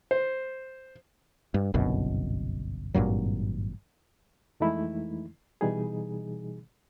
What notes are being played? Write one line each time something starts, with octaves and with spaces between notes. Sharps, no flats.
C5
G2
G1 C2 F#2 B2
G#1 G2 A#2 F#3
F2 E3 G#3 A3 D#4 E4
B2 E3 G3 D#4 G#4